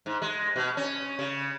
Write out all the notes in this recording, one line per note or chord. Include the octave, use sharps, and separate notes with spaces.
G#2
G#3
B2
C#4
C#3